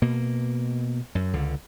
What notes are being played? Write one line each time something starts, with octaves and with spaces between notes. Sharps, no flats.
B2 A#3
F#2
C#2 D3